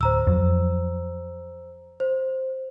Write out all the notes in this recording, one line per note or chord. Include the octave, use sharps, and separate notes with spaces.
D1 C5 A#5 E6
F2 F#3
C5